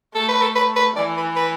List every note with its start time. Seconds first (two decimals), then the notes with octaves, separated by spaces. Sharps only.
0.15 A3 A4
0.28 B4
0.42 A4
0.56 B4
0.76 B4
0.96 E3 D5
1.17 B4
1.36 B4